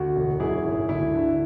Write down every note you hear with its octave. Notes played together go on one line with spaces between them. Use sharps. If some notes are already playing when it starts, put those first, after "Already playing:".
Already playing: D2 F#4
E1
F#2 E4 G#4
G#1
D2 E4
D3